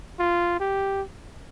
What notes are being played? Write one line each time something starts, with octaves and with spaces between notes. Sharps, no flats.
F4
G4